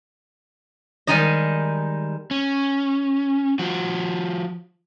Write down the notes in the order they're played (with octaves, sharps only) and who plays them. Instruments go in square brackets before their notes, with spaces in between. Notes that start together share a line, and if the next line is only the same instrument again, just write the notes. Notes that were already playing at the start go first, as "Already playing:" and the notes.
[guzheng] D#3 G3 G#3 D#4 D#5
[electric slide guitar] C#4
F3 F#4